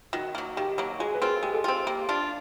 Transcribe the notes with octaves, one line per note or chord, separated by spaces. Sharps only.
D#3 F#4
F#3 A#3
D#3 G4
F#3 A#3
G#3 F#4 G#4
B4
C4 F4 G#4 A#4
G#3 G4
G4 A4
C4 F4 G4
A#3 G4
D4 F4